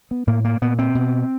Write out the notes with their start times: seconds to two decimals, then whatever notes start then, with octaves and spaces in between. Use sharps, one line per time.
0.11 B3
0.27 A2 A#3
0.45 A#3
0.61 A#2 B3
0.79 C4
0.95 B2